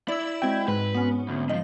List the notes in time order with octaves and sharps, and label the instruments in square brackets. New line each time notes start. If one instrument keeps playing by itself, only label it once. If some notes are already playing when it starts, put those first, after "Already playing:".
[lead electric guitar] E4 [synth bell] D5 E6
[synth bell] G#3 C4 F#4 [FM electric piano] G5 G#6
[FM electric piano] G#2 [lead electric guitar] B4
[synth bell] B3 C#4
[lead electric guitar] D2
[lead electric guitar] D#3 F3 [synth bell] D#5